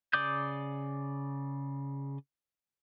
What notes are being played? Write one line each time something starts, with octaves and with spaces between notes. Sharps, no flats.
C#3 D5 D6 D#6 G6